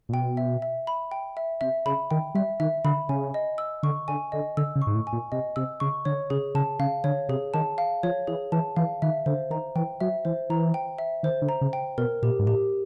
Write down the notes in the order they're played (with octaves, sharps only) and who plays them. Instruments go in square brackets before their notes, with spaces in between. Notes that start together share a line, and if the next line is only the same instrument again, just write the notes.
[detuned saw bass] A#2
[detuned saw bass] B2 [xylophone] G5
[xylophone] E5
E5
B5
G5
E5
[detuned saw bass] C3 [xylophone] E5
[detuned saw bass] C#3 [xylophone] B5
[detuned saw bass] D#3 [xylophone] G5
[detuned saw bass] G3 [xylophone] E5
[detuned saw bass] D#3 [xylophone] E5
[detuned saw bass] D3 [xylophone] B5
[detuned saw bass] C#3 [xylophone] G#5
[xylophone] D#5
E6
[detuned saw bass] D3 [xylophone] C#6
[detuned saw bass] D3 [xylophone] G#5
[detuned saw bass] D3 [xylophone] D#5
[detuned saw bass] D3 [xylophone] E6
[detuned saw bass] C#3
[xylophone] C#6
[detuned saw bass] G#2
A2
[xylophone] G#5
[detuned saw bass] A#2
[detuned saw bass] C3 [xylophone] D#5
[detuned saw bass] C3 [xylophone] E6
[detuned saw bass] C#3 [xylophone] C#6
[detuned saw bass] D3 [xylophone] C#5
[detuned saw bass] C#3 [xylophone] G#4
[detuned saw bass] C#3 [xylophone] A5
[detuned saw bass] C#3 [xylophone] F5
[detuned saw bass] D3 [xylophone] C#5
[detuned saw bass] C3 [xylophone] G#4
[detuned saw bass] D#3 [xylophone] A5
[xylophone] F5
[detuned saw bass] F3 [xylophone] C#5
[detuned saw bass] E3 [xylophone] G#4
[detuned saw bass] E3 [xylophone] A5
[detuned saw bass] E3 [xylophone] F5
[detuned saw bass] D#3 [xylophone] E5
[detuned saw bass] D3 [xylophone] C5
[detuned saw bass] D#3 [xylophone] A#5
[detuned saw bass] E3 [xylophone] G5
[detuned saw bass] F#3 [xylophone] E5
[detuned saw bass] E3 [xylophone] C5
[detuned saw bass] E3 [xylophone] A#5
[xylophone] G5
E5
[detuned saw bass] D#3 [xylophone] C5
[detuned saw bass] D3
[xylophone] A#5
[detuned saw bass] C#3
[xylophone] G5
[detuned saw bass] B2 [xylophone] A#4
[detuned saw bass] A#2 [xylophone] G4
[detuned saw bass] G#2
[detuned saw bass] A2 [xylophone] G4